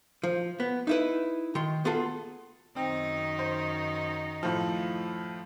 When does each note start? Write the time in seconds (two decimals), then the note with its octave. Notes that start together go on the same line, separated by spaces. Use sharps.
0.23 F3
0.60 B3
0.87 D#4 E4 B4
1.55 D#3 C6
1.85 B3 F4 G#4 A4
2.76 F#2 D#3 C4 D#4
3.39 C5
4.43 A2 F3